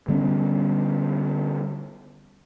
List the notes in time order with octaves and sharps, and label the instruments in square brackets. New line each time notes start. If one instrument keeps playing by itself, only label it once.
[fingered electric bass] D3 G3 B3 C#4